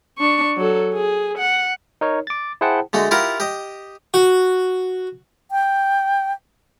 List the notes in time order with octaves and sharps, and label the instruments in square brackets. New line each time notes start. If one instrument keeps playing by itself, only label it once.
[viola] D4 C#6
F#3 A4
G#4
F#5
[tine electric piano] D#4 A#4 C#5
D6 A6
E4 G#4 C5 F#5 G5 A5
[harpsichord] D3 G#3 A3 F#4
E4 F4 G4 A#4 F5 F#5
G4 D#5
F#4
[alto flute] G5